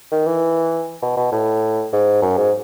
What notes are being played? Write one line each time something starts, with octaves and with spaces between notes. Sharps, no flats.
D#3
E3
B2
B2
A2
G#2
F#2
G#2